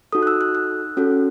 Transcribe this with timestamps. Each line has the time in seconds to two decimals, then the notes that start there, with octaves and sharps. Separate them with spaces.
0.12 D#4 F#4 A4 D#6
0.23 F#6
0.27 E6
0.41 F#6
0.55 F#6
0.97 C#4 F#4 A4